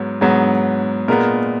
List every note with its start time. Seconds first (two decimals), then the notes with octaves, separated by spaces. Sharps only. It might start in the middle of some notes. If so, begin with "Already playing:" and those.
Already playing: G#2 F#3 B3
0.21 G#2 F#3 B3
1.08 A#2 G#3 B3 A#4